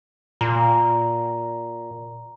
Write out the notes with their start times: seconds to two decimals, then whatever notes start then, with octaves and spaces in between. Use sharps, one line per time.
0.41 A#2 A#5